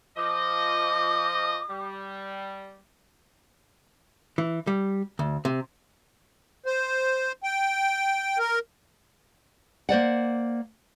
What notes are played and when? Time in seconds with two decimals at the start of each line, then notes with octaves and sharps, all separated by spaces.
0.17 F3 D#5 D6
1.70 G3
4.38 E3
4.67 G3
5.19 D2
5.45 C3
6.66 C5
7.43 G5
8.39 A#4
9.89 A#3 C5 D5 F#5